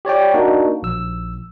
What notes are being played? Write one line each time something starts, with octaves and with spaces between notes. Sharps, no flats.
G4 C#5 D5 G5
A#3 D4 D#4 F#4
A#1 E6